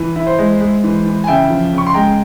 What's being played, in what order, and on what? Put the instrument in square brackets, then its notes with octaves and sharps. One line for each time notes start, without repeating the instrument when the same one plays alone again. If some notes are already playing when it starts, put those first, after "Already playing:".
Already playing: [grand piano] E3
E4
C5
G#3
G#3
E3
E3
G#5
C#3 E5 G5
F3
C#3 C#6
C6
G#3 G5 A#5